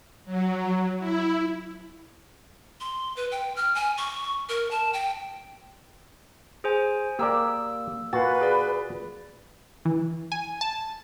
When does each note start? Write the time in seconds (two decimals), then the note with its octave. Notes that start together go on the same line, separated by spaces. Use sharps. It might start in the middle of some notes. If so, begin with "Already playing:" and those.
0.25 F#3
0.99 E4
2.80 C6
3.16 B4
3.32 G5
3.56 F6
3.75 G#5
3.98 C#6
4.49 A#4
4.71 A5
4.93 G5
6.64 G#4 C5 G#5
7.19 A#3 G4 A#4 D5 E6
8.13 A#2 F#4 B4 F5 A6
8.41 G#4 D5
9.85 E3
10.32 G#5
10.61 A5